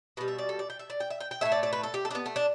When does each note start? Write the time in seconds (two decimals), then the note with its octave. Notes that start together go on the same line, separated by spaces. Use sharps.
0.17 B2 G3 B4
0.28 E5
0.38 D5
0.49 A4
0.59 D5
0.70 G5
0.79 E5
0.90 D5
1.00 G5
1.10 E5
1.20 G5
1.31 G5
1.41 A2 A3 E5
1.52 D5
1.63 D5
1.73 B4
1.83 A4
1.94 G4
2.05 A4
2.11 D4
2.15 B3
2.26 A3
2.36 D4